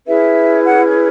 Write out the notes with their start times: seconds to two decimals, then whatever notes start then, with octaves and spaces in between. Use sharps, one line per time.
0.06 C#4 E4 G#4 B4 E5
0.65 F#5